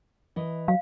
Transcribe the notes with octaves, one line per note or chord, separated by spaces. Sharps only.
E3 D#5
F#3 F5